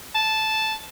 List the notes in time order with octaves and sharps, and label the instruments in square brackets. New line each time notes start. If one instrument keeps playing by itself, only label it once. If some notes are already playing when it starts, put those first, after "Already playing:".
[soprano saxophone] A5